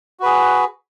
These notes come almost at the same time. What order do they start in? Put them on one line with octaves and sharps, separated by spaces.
F#4 B4 G#4